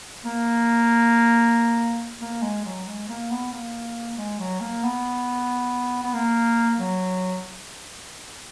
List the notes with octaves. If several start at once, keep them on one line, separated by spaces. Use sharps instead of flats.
A#3
A#3
G#3
F#3
G#3
A#3
B3
A#3
G#3
F#3
A#3
B3
B3
A#3
F#3